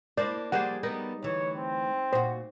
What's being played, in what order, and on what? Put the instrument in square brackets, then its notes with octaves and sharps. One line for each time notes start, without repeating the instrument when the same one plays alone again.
[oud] A#3 D4 E4 [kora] C5 [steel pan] D5
[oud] F3 A#3 D4 [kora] G3 G#4 C5 [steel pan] F#5
[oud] G3 B3 A#4 [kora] D#4
[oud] D2 E3 [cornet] C#5
[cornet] C4
[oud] A#2 F#4 [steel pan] C5